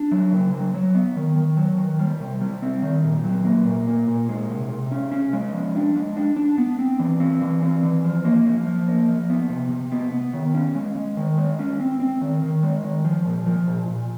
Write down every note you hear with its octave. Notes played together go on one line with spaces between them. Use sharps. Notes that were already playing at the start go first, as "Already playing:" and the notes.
Already playing: D4
F#3
C#3
F#3
F#3
B3
D#3
D#3
F#3
D#3
G3
C3
G3
C4
D#3
A#2
F#3
A#3
A#2
A#3
A#2
G#3
C3
C3
C#4
C#4
G#3
F3
D4
G#3
D4
D4
B3
C4
E3
C4
E3
C4
E3
F3
A#3
F3
F3
A#3
F3
B3
C3
C3
B3
B3
D#3
C#4
G#3
G#3
D#3
G#3
C#4
C4
C4
D#3
D#3
G#3
D#3
F3
A#2
F3
A#2
A#2